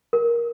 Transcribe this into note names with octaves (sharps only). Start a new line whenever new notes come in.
A#4